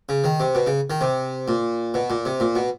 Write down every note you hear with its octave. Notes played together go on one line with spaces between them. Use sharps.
C#3
D#3
C3
B2
C#3
D#3
C3
A#2
B2
A#2
C3
A#2
B2